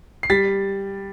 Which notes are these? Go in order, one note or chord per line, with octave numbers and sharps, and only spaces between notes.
C7
G3 A6 B6